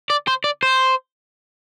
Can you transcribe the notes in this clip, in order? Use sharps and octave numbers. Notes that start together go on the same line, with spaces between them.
D5
C5
D5
C5